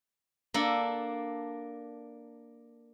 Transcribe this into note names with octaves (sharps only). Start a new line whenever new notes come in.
A#3 D4 A4